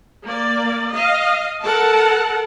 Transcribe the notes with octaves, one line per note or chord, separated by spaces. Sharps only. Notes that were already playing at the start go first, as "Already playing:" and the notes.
A#3 D5
D#5 F5
A4 A#4 F#5 A5